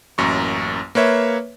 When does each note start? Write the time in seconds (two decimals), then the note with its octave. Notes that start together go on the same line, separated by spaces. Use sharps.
0.18 A1 F#2 A#3 C#6
0.95 A#3 B4 C#5 E5